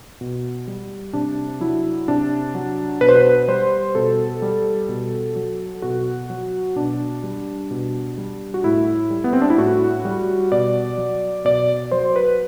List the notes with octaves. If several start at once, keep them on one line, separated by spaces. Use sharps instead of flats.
B2
G3
C3 D4
F#3 E4
C3 D4
F#3
B2 B4
C5
B4
G3 C5
B2 A4
G3
B2
F#3
B2 F#4
F#3
B2 D4
G3
B2
G3
F#4
A2 E4
G3
B3
C4
D4
E4
A2 F#4
G3
B2 D5
F#3
B2 D5
F#3 C5
B4